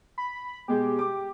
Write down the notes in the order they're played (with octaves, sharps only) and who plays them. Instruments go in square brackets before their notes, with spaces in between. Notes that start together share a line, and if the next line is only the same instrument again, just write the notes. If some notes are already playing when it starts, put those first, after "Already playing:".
[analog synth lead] B5
[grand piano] B2 G#3 [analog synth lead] G4
[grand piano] D6